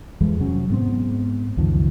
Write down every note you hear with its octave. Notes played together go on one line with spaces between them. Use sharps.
F2 E3 F3 G#3
C3 F#3 C#4
G#2 B3 C4
C#2 F#2 D#3 F3